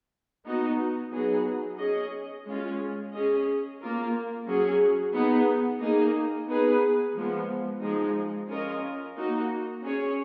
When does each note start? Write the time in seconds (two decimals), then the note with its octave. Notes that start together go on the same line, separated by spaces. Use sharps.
0.45 B3 D#4 F#4
1.12 F#3 B3 D#4 G#4
1.79 C#4 G#4 D#5
2.46 G#3 C#4 F4
3.12 C#4 G#4 D#5
3.80 A#3 F4 A#4
4.47 F#3 C#4 G#4
5.14 B3 D#4 G#4
5.81 A#3 D#4 G#4
6.47 B3 D#4 G#4 B4
7.15 F3 G#3 B3
7.81 F3 G#3 D#4 G#4
8.49 C#4 F4 A#4 D#5
9.16 A#3 D#4 F#4
9.82 C#4 G#4 C#5